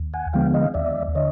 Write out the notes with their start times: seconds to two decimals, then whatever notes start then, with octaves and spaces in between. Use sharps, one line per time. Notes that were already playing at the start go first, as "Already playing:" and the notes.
Already playing: D#2
0.14 F#5 G#5
0.33 D3 F3 G#3 B3 F5 G5
0.54 D#5 F5
0.74 D#2 D5 E5
1.15 D3 C#5 D#5